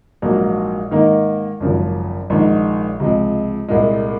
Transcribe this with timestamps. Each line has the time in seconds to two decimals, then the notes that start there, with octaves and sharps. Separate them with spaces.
0.22 A#1 G#2 F#3 A#3
0.91 G#2 D#3 A#3 D#4
1.60 G#1 F#2 C#3 F3
2.30 A#1 G#2 D#3 G#3 D#4
3.00 C#2 C3 F3 G#3
3.68 C2 A#2 G#3